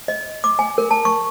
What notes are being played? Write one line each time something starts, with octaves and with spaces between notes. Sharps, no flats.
D#5
D6
G#5
A#4
A5
C#6